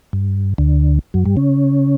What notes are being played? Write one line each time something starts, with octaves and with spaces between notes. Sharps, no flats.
G2
D2 D3
F#2 F#3
G2 G3
C#3 C#4